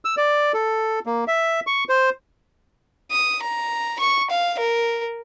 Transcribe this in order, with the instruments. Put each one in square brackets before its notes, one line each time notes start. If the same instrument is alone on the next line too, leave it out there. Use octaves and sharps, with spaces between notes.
[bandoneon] E6
D5
A4
A#3
E5
C#6
C5
[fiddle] D#6
A#5
C#6
F5
A#4